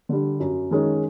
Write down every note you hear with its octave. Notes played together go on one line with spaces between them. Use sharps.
D3 G3
F#2
D#3 G#3 C#4